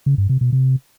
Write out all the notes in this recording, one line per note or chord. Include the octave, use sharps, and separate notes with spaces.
C#3
G2
C3
B2
C3